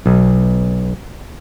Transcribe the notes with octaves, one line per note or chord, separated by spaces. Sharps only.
B1